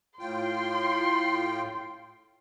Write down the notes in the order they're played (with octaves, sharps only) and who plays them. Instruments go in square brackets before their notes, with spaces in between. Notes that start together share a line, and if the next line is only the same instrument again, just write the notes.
[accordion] A2 F4 G5 [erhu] C6